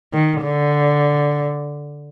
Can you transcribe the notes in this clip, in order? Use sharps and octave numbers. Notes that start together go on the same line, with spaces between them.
D#3
D3